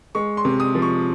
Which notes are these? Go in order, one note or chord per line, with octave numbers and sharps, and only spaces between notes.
G#3 C#6
C6
C3
D#6
F3
C#6